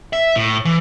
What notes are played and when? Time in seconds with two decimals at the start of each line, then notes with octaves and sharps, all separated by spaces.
0.13 E5
0.36 A2
0.65 E3